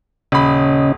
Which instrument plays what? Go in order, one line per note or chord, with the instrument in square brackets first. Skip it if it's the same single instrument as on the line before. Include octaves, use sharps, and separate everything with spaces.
[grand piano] D#1 B5 [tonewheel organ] C#3 C#4 D#5